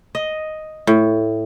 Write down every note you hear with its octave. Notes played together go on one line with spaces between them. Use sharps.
D#5
A2